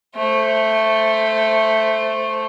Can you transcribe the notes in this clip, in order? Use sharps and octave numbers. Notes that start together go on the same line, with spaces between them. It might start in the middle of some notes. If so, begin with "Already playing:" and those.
A3 C5